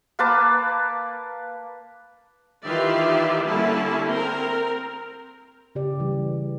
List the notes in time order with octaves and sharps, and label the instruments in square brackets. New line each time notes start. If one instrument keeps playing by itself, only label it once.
[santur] A#3 B4 A5 D6
[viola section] D#3 E3 F4 G4 D5 E5
D3 G3 A#3 C#4 E4 A5
C4 A#4
[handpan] C#3 G4 D5
E3 G3